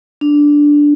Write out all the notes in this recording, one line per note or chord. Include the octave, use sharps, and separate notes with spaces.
D4